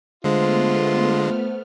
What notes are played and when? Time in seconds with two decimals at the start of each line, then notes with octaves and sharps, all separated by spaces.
0.24 D3 G#3 A3 B3 F4 C5 F6